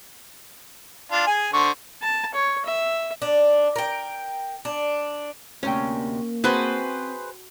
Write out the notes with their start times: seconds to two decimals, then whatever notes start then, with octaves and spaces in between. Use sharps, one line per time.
1.12 D4 F4
1.27 G#4 G#5
1.53 D3 C5 C#6
2.02 A5
2.35 C#5
2.66 E5
3.22 D4
3.76 A#4 G5
4.65 D4
5.63 D2 C3 A#3 C#4 G5
6.44 C4 F#4 G#4 B4 C5 A5